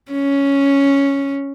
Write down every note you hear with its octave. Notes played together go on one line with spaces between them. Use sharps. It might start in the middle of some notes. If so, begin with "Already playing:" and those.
C#4